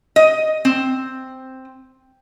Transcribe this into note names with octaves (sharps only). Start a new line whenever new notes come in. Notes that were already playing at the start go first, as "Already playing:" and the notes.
D#5
C4